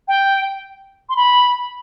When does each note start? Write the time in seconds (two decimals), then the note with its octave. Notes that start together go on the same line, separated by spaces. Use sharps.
0.08 G5
1.09 C6
1.16 B5